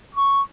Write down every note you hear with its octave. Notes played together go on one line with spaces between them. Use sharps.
C#6